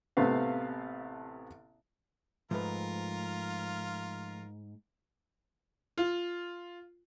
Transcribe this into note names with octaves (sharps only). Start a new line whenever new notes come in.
A1 C3 A3 B3 F5
G#2 F3 A3 F4 A#4 B4
F4